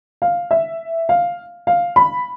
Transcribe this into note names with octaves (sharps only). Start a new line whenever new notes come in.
F5
E5
F5
F5
B5